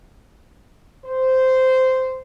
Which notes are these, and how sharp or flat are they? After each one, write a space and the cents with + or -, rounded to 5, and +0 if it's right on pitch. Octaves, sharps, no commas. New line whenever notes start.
C5 -10